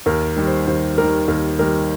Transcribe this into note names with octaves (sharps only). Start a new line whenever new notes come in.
D#2 A#4
D#3 G3
C5
D#2 C5
D#3 G3 A#4
D#2 A#4
D#3 G3 A#4